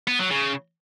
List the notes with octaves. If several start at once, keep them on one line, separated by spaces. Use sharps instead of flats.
B3
F#3
C#3